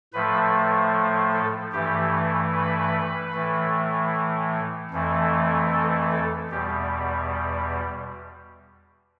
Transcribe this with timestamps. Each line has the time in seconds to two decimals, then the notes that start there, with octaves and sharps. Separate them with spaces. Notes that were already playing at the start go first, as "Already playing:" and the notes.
0.13 A2 F3 A3 B4
1.33 A4
1.72 G2 E3 A3 G4
2.53 B4
3.33 A2 E3 A3
4.91 F2 E3 A3
5.72 A4
6.12 A4
6.51 E2 B2 G3 G4